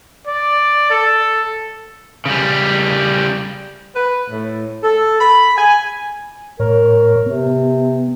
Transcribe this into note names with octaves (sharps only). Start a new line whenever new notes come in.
D5
A4
C#3 G3
B4
A2
A4
B5
G#5
A2 A#4 C#5
C3 B3